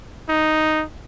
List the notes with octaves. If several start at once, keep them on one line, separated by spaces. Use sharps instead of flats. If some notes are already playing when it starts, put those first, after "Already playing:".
D#4